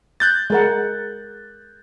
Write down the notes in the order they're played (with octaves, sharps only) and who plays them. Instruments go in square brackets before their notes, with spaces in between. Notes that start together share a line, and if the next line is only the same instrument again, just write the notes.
[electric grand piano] F#6 G6 A6
[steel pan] G#3 A#4 F#5